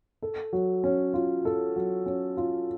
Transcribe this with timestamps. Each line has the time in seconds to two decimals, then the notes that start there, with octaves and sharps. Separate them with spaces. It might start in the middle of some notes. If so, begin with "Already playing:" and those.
0.22 A4
0.53 F#3
0.84 C#4
1.14 F4
1.45 A4
1.76 F#3
2.06 C#4
2.37 F4